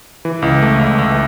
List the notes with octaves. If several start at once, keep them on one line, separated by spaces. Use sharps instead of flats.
E3
C#2
A3
C#2
C#2